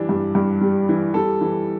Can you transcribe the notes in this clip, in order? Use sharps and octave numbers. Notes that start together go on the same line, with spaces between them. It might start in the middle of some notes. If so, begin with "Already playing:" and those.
Already playing: E3 G3 D4
G2
G2
G3
E3
G3 A4
E3